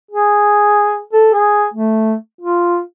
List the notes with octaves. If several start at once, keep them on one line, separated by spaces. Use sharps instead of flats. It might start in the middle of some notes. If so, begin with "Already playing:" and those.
G#4
A4
G#4
A3
F4